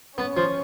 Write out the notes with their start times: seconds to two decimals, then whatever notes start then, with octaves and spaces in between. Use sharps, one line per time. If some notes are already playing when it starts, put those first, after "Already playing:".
0.18 B3 C#4
0.37 F3